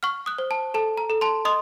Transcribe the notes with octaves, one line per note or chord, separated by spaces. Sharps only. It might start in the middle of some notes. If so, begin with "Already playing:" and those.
F#5 C#6 F6
D#6 F#6
C5
A5
A4 A5
A#5
A4
A5 C6
D#5 C6 D#6